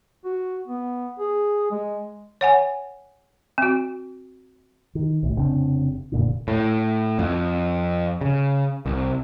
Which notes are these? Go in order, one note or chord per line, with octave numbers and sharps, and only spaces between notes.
F#4
B3
G#4
G#3
C#5 F#5 G#5
C4 F#4
D#3
B1 A2
F1 C#3 C4 D4
F1 A#2 D3
A2
F2
C#3
C2